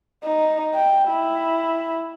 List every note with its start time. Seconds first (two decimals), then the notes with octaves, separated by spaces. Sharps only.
0.24 D#4
0.74 G5
1.09 E4